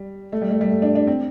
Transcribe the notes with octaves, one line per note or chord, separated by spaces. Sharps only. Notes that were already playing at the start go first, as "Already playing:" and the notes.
Already playing: G3
A3
G3
A3
G3
A3
D4
D4
C4